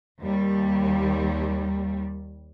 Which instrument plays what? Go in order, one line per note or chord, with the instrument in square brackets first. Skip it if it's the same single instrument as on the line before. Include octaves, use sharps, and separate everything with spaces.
[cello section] D#2 G3